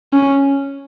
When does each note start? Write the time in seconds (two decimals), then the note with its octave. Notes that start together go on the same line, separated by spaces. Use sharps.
0.13 C#4